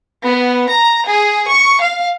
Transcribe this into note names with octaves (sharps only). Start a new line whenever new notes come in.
B3
A#5
G#4
C#6
F5